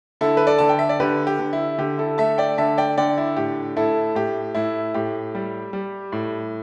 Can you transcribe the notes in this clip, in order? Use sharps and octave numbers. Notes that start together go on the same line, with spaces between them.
D3 E4 A4
B4
A4 D5
D3 A5
G5
E5
D5
D3 G4 B4
G4
D3
E4
D3 G4
E4 A4
A3 E5 A5
D5 G5
D3 E5 A5
D5 G5
D3 D5 G5
E4
A2 G4
A2 E4 A4
A2 G4
A2 E4
A2 G4
G3
G3
A2